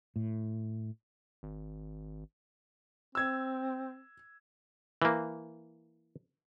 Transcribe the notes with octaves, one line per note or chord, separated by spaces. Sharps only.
A2
G#1
C4 E6 G#6
E3 A#3